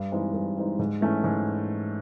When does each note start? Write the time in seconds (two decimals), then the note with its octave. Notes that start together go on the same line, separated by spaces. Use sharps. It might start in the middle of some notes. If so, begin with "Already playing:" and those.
Already playing: G2
0.12 E3 G#3 C4 D#4
0.34 G2
0.57 E3 G#3 C4 D#4
0.79 G#2
1.01 E3 A3 C#4
1.24 G#2